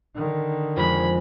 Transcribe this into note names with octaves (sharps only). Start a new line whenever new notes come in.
D3 D#3
F2 G#3 B5